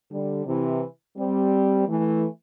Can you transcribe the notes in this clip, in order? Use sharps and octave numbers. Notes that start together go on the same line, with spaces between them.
D3 G3
C3 E3
G3 C4
E3 A3